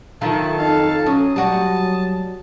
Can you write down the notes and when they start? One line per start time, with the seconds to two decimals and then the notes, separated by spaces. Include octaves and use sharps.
0.22 D#3 F#3 F4 A4 E5 A5
0.58 F2 D#4 A4 F5
1.06 F#3 C#4 D#6
1.36 F#3 G3 F#4 A5